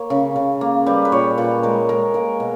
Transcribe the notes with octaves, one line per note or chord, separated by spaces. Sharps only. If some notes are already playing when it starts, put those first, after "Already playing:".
Already playing: A#3 C#5
C#3
C#3
A#3
G3 B4
B4
A#2 C#5
A#2 B4
G#3 A#4
G#3 A#4
A#3 A#4
B2